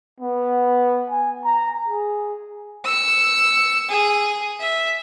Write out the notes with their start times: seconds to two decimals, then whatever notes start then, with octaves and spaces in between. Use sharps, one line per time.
0.21 B3
1.10 G#5
1.45 A#5
1.89 G#4
2.85 E6 C#7
3.89 G#4
4.60 E5